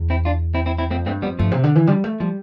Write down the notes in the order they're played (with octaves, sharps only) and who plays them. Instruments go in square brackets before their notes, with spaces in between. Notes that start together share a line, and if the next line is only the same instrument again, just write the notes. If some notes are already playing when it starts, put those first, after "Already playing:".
Already playing: [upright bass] E2
[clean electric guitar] C4 E4
D4 F4
C4 E4
C4 E4
C4 E4
[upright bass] F2 [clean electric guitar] A3 C4
[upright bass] G2 [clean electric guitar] A3 C4
[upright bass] F2 [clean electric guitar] G3 B3
[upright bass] G2 [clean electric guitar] F3 A3
[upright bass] C3
D3
E3
[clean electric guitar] D3 F3 [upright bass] G3
[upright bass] A3
[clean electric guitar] F3 [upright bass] G3